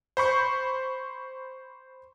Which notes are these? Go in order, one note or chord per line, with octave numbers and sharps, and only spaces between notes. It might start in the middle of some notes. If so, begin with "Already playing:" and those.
C5 B5 C#6 G6